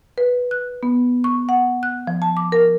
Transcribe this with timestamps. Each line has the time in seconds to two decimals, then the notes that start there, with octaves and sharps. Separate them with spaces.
0.18 B4
0.51 F#6
0.83 B3
1.24 C#6
1.49 F#5
1.83 F#6
2.07 F3
2.22 A5
2.37 D6
2.52 A#4